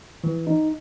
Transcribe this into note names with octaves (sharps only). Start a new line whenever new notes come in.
E3
D#4